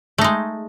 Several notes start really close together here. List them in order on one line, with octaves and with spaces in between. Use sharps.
A3 D#4 G#3